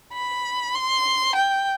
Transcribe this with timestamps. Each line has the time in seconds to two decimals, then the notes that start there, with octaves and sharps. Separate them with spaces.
0.13 B5
0.74 C6
1.36 G5